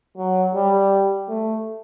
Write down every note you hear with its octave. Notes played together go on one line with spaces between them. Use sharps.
F#3
G3
A3